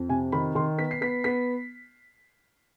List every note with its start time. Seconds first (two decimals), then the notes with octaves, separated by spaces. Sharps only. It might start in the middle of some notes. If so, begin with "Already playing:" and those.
Already playing: F2
0.09 C3 G#5
0.32 D#3 B5
0.55 D#3 C6
0.78 B3 B6
0.91 C7
1.01 B3 B6
1.24 B3 B6